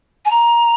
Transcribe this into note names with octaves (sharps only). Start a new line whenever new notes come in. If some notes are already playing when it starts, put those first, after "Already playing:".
G#5
A#5